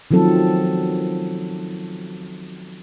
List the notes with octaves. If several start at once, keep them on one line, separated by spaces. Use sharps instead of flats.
D#3 F3 F#3 C4 A4